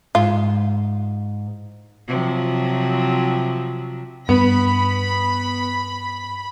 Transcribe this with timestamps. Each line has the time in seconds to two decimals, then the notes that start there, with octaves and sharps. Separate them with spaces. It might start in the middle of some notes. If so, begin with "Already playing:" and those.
0.15 G#2 F4
2.08 C3 F3 F#3
4.29 G2 B3 B5